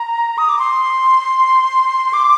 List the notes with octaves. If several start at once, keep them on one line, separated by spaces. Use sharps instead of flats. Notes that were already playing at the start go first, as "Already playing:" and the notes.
Already playing: A#5
D#6
D6
C6
D6